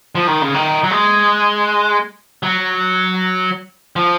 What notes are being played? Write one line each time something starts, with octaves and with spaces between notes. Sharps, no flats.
F3
D#3
C#3
D#3
F#3
G#3
F#3
F3